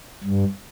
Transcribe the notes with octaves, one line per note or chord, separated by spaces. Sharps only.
G2